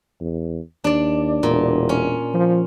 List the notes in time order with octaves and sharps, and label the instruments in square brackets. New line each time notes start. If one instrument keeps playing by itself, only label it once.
[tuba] E2
[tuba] D#2 [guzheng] D4 D5
[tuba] E1 [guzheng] A#2
[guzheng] C#4
[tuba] F3